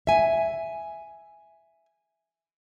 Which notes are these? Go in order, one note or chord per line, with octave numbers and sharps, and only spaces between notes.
E5 G#5